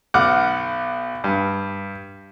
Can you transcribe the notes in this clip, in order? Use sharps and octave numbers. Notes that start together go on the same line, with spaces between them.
B1 F#5 D6 F6
G2